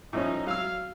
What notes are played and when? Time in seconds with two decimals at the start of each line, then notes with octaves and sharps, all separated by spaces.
0.13 A2 F3 C#4 D#4
0.47 F#3 F5 E6